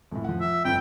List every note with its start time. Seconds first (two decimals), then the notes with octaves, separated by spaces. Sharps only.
0.11 F1 A2
0.24 F3 F#5
0.41 E5
0.65 G1 F2 G5